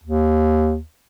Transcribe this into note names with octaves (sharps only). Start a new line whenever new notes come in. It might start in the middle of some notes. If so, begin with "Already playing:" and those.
D#2